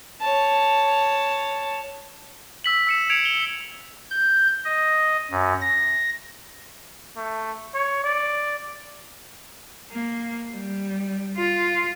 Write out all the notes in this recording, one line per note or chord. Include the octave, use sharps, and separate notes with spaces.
C#5 A5
E6 B6 F#7
E6 C#7 E7
G#6 C#7 D7 F7
F7 G7
G6
D#5
F#2
A#6
A3
C#5
D5
A#3
G3
F4